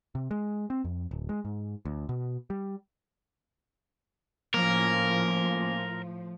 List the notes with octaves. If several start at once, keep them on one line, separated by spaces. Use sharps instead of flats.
C3
G#3
C4
F2
D1
G#3
G#2
D2
B2
G3
A2 F3 A#3 C#4 A#4